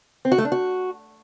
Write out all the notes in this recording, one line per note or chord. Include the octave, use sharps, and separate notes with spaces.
C4
F#4
A3
D4
F#4